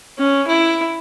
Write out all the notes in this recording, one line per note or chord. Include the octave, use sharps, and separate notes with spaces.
C#4
E4